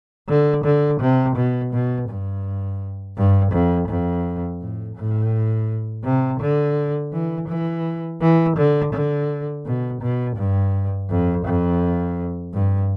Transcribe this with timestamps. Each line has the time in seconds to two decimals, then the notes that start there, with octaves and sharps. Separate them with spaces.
0.29 D3
0.65 D3
1.01 C3
1.36 B2
1.73 B2
2.09 G2
3.17 G2
3.52 F2
3.89 F2
4.61 A2
4.96 A2
6.05 C3
6.41 D3
7.13 E3
7.48 E3
8.21 E3
8.57 D3
8.93 D3
9.66 B2
10.02 B2
10.37 G2
11.09 F2
11.46 F2
12.54 G2